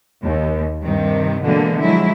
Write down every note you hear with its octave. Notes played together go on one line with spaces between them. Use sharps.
D#2
G2 C3 D#3
B2 D3 E3 G3 G#3 A#3
F3 F#3 G#3 E4